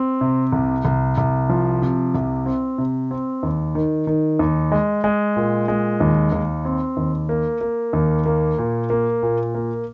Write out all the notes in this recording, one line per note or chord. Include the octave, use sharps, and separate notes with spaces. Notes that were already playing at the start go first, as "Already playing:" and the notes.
Already playing: C4
C3
C2
C2
C2
F3
C3
C2
C4
C3
C4
D#2
D#3
D#3
D#2
G#3
G#3
A#2
G#3
D#2
D#2
C4
D#2
A#3
A#3
D#2
A#3
A#2
A#3
A#2
A#3